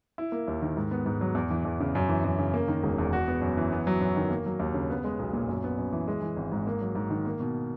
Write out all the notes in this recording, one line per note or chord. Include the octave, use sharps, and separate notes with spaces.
E4
A#3
D#2
D#3
G#2
B3
G#2
F#3
E2
E3
E2
C#3
F#2
E3
F#2
C#3
A#3
D#3
E1
E2
F#4
B3
F#2
E3
B3
F#3
F#2
D#3
A#3
F#3
D#2
C#3
B3
G#3
B1
A#2
F#2
B3
F#2
E3
G#3
E3
G#1
G#2
A#3
F#3
G#2
D#3
A#3
B2